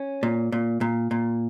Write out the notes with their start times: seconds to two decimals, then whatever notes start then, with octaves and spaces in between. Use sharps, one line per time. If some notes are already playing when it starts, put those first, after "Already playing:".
Already playing: C#4
0.23 A#2
0.52 A#2
0.81 A#2
1.11 A#2